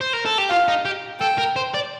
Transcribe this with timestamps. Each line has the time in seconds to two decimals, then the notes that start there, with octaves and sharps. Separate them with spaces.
0.01 C5
0.13 A#4
0.25 A4
0.38 G4
0.50 F4 F5
0.68 D#4
0.85 G4
1.20 A4 G5
1.38 A#4
1.56 C5
1.74 D5